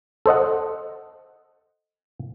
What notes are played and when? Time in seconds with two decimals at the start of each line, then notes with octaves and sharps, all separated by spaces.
0.26 A4 C5 D#5 F#5